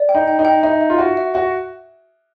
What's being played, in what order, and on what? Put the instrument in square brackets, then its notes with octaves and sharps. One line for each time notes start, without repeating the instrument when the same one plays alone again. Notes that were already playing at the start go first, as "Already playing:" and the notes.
Already playing: [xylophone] D5
G5
[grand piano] D#4
[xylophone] G5
[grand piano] D#4
[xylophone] G5
[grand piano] D#4 [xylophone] E5
[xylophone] E5
[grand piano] F4
[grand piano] F#4 [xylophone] E5
[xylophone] E5
[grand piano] F#4 [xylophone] E5